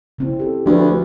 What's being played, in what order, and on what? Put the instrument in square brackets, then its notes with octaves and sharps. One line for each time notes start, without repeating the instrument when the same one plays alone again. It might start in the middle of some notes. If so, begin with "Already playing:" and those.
[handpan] C#3 C4 E4
G4 A4
[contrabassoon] D2 [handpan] F3 B4